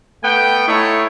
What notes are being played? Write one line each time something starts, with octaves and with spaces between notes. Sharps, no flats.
A3 B3 G5
A3 D#4 E4 C#5